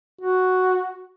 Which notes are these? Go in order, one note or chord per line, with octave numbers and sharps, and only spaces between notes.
F#4